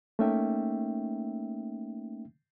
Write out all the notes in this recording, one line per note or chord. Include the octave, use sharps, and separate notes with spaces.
A3 A#3 C#4 D#4 E5 G5